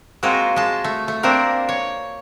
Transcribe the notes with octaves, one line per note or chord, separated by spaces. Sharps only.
G#3 A#3 C4 F4 F#4
G#3 A5
A3
A3
A#3 C4 D4 A#4
C#5